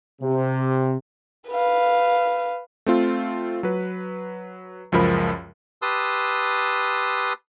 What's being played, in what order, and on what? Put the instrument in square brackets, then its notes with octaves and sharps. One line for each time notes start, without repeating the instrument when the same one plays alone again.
[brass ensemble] C3
[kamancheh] B4 F5
[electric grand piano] A3 C4 F4
F#3 B4
C#2 F#2 F3 A#4 B5
[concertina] G4 B4 A5 C6 D#6 E6